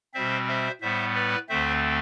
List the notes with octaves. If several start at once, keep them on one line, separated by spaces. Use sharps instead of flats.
B2 G3 C4 C5 E5
C5 E5
A2 G3 B3 C5 E5
B4 D5
D2 D3 A3 C4 C5 E5